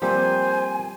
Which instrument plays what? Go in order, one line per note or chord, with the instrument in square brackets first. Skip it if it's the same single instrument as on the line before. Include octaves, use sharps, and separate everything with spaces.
[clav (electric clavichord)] F3 A#3 C4 [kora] G3 [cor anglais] C5 [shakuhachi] G#5